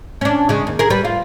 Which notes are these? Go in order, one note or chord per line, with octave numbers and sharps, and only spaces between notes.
C#4 D4
C#3 G#3
D#2
G#4 A#4
G3 B4
F4